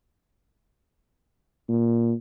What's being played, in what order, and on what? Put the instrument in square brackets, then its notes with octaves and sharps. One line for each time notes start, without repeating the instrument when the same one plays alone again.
[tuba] A#2